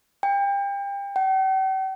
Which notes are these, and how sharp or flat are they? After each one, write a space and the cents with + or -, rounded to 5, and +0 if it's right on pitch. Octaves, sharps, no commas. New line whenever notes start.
G5 +30
G5 -45